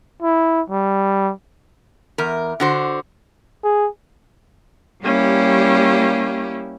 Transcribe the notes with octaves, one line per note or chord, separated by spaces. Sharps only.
E4
G3
E2 A#4
D3 F#4 C5
G#4
G3 A#3 C#4 E4 G4